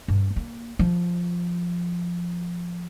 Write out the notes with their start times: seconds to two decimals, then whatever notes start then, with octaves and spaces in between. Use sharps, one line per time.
0.08 G2
0.36 A#3
0.79 F3